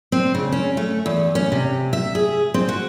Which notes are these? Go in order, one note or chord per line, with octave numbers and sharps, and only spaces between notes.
C4
C#3
C#4
A3
E2
C#4
C3
E5
G#4
C4
F#4